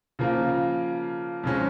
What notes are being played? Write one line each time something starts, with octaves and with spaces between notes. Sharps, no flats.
C#3 F3 A#3
F2 C#3 G#3 C#4